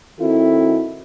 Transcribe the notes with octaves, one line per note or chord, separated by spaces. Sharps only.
D#3 C4 E4 F#4 A4